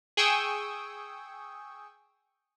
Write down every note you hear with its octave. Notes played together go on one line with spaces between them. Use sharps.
G#4 G5 C#6 D#6 E6